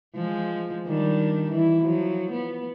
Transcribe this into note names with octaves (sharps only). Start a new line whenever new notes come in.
F3 G#3
D#3 G3 D4
E3 E4
F3 F#3
B3